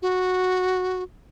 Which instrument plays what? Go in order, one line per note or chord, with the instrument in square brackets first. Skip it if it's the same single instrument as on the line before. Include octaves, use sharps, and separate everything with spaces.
[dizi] F#4